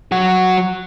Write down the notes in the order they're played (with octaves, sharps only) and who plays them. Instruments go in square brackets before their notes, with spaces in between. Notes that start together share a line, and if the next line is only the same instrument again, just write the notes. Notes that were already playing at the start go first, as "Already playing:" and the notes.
[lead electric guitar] F#3 F#4